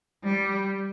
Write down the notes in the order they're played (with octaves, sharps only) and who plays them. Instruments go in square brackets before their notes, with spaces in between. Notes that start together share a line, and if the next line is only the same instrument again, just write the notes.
[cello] G3